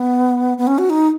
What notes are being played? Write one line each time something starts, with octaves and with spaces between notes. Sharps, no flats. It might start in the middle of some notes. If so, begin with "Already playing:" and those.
Already playing: B3
B3
C#4
F#4
D#4